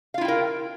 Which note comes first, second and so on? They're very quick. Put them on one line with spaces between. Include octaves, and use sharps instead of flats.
F5 F4 E4 G5 A#4